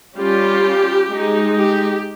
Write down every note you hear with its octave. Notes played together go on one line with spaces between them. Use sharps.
G3 C#4 F4 G4
G#3 D#4
G4